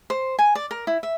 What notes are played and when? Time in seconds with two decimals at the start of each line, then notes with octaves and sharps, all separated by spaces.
0.10 C5
0.39 G#5
0.55 D5
0.71 A#4
0.87 E4
1.03 E5